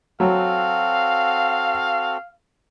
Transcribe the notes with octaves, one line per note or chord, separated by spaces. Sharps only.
F#3 C4 F#4 A4 F5